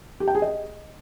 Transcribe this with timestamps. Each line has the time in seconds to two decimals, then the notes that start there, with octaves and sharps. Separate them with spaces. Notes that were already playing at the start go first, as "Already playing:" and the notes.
0.20 G4
0.28 G5
0.35 G#4
0.42 D#5